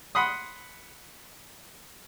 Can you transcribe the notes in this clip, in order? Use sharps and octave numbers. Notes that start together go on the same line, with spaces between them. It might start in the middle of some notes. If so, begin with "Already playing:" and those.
F#5 B5 C6 D#6